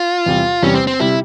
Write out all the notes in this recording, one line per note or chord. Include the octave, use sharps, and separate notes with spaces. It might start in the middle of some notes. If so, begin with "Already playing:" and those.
Already playing: F4
E2 C3 G3
E2 C3 G3 C#4
C4
C4
C3 G3 E4